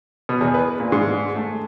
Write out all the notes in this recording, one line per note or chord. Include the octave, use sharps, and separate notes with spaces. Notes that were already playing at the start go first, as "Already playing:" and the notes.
B2
E2
B4
A#2
G#2
A3